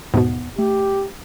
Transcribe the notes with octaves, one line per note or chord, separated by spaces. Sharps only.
D#2 G#2 B2 B3
A3 G4